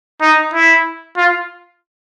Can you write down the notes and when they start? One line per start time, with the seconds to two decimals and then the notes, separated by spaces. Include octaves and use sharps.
0.21 D#4
0.54 E4
1.17 F4